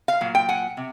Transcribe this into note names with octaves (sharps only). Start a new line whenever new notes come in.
F5
A#2 F#3
G5
F#5 G#5
C3